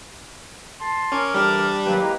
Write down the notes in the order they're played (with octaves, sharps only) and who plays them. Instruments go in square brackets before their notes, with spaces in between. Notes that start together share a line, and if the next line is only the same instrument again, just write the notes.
[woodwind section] A5 C6
[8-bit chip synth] C#4 [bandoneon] A#4 D6
[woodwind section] D2 E3 F6 [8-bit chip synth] G3 D4
[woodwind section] G2 D#3 F#3 [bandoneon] A#3 G4 B4
[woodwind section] G#3 E4 A#5